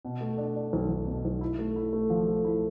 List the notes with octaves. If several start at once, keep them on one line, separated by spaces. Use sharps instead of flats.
B2
A3
D4
D4
B1
B1
B2
B1
E4
A3
E4
A3
F3
A3
E4